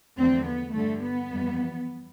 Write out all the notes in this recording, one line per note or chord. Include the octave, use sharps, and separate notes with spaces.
E2 D3 F3 A3 C4
B3
G2 D3 G3 A3
B3
F2 E3 G3